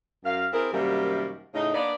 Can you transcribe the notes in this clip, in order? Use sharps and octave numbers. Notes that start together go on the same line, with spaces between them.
F#2 F5
C4 E4 G#4 A#4
F#2 C3 D#3 G3 A#3
A2 C#3 D#4
A#3 B3 D4 D5